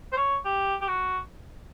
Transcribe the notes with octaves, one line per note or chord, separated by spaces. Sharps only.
C5
C#5
G4
G4
F#4